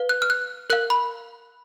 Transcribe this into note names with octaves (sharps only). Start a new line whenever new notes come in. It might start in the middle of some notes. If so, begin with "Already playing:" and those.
Already playing: B4 F5
F#6
F6
F#6
A#4 F5 F#6
B5